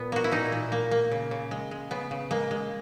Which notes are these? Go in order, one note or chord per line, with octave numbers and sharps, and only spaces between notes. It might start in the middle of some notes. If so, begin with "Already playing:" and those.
Already playing: A#2 B3
A#3 F#4
E4
A#2 D#4
A#2
A#3
A#3
C#3
C#3
G#3
G#3
C#3 B3
C#3
G#3 A#3
G#3